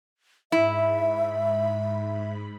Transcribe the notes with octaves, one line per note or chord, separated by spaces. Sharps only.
G#2 E4 E5 B5